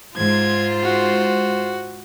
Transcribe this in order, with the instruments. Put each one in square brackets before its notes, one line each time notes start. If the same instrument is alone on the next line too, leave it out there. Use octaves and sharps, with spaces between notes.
[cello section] G#2 [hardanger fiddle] F4 C5 [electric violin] G#6
[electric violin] F#4